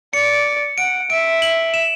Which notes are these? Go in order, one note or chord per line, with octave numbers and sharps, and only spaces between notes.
D5 C#7
F#5 D7
E5 D7
F#7
E7